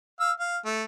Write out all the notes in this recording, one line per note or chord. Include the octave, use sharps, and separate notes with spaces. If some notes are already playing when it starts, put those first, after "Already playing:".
F5 E6
F5
A3